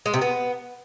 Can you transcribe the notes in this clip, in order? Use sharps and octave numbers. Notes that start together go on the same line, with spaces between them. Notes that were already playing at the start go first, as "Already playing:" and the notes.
G#3
C3
B3